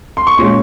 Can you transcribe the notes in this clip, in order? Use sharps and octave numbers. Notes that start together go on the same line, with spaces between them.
C6
C#6
A#2 G#3 C#4 C6